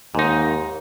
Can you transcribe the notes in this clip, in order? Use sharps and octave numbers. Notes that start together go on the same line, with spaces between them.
D#2 G#2 D#4